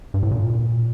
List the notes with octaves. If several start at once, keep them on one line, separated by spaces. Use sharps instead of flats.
G2
A2
A#2